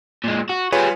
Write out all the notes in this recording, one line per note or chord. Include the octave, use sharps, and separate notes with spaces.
A#2 G#3
F#4
G3 F4 G#4 B4 C#5